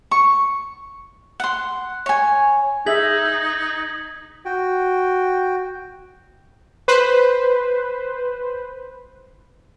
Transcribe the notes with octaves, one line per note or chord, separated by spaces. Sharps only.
C#6
F#5 C6
C#5 G#5
D#4 G#4 E5 G#6 B6 F#7
F#4 G5
B4 C5